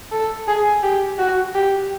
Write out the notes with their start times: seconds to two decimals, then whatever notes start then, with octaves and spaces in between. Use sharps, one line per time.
0.12 A4
0.48 G#4
0.83 G4
1.19 F#4
1.55 G4